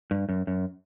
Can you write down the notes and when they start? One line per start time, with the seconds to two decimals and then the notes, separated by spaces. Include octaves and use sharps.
0.11 G2
0.29 F#2
0.47 F#2